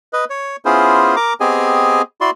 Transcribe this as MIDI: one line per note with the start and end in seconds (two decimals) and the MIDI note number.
0.13 0.25 71
0.13 0.25 75
0.30 0.56 73
0.65 1.16 59
0.65 1.16 61
0.65 1.16 64
0.65 1.16 65
0.65 1.16 68
0.65 1.16 72
1.16 1.34 70
1.16 1.34 82
1.16 1.34 86
1.40 2.02 59
1.40 2.02 60
1.40 2.02 67
1.40 2.02 68
1.40 2.02 75
1.40 2.02 80
2.21 2.30 64
2.21 2.30 66
2.21 2.30 74
2.21 2.30 84